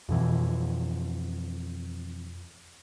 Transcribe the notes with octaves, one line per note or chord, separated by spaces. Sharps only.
F2 B2 E3